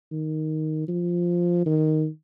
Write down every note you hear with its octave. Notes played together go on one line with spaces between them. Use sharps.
D#3
F3
D#3